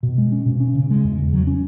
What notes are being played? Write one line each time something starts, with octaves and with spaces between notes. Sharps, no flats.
B2
G#3
C#4
B2
C#4
C#3
G#3
E2
C#3
F#3
C#4